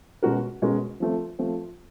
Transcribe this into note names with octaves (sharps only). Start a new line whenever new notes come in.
B2 G#3 C#4 F#4 A#4
B2 G#3 C#4 F#4 A#4
F3 A3 C4
F3 A3 C4